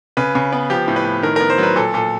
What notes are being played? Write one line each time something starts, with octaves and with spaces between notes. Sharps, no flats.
C#3 B4
C#3
B3
F3 G4
A2
B4
A2
D#3 A#4
A#4
B3
C5
F#3 B4
A#2 A4
A#2 A4